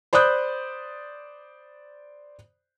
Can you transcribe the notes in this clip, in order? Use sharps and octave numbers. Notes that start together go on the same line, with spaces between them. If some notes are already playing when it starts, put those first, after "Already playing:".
C5 D5 B5 D#6 F#6 G6